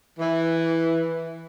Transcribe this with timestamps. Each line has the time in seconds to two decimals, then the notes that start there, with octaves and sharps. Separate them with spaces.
0.20 E3